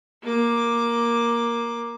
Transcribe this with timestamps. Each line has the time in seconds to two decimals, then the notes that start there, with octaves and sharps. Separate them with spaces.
0.23 A#3 D6